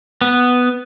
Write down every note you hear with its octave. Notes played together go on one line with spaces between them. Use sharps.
B3